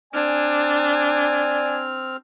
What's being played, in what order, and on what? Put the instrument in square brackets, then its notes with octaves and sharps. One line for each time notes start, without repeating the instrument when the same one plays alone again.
[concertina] C4 F6 [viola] D4 [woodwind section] D5 G#5